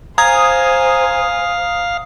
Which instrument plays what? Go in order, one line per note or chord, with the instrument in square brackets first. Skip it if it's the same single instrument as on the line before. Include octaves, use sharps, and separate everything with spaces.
[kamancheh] C5 G#5 [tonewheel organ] F5 [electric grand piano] A#5 G#6 [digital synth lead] D#6